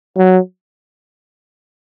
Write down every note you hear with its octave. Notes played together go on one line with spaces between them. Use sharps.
F#3